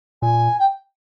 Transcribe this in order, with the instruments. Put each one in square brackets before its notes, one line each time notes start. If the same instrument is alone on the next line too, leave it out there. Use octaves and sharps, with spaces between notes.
[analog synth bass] A#2 [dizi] G#5
[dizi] G5